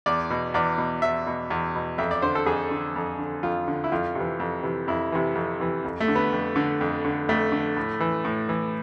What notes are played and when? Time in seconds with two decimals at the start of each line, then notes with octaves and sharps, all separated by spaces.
0.06 E2 D5
0.30 B2
0.54 E2 D5
0.78 B2
1.02 E2 E5
1.27 B2
1.50 E2
1.75 B2
1.98 F2 E5
2.11 D5
2.22 D3 C5
2.35 A4
2.46 F2 G#4
2.71 D3
2.96 F2
3.19 D3
3.43 F2 F4
3.68 D3
3.84 E4
3.92 F2 F4
4.15 C3 E3
4.40 F2
4.63 C3 E3
4.88 F2 E4
5.12 C3 E3
5.35 F2
5.60 C3 E3
5.84 F2
6.00 A3
6.08 D3
6.15 B3
6.33 F2
6.56 D3
6.81 F2
7.05 D3
7.29 F2 A3
7.52 D3
7.77 A2
8.00 E3
8.25 A2
8.49 E3